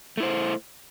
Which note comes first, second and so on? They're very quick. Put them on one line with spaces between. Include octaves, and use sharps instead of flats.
A3 E4 C5